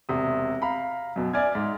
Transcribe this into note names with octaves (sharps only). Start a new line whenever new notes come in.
E1 C3 D#6
F5 A#5 B5
F#2 B2
D5 E5 G#5 F6 G#6
G#2